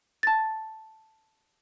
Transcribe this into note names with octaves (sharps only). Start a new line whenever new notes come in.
A5 A6